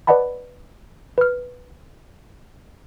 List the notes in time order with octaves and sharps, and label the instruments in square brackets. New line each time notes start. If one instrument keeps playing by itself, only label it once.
[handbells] B4 D5 D#5 F#5 A5 B5
B4 F6